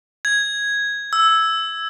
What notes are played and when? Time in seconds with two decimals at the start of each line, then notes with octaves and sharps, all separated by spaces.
0.25 G#6
1.13 E6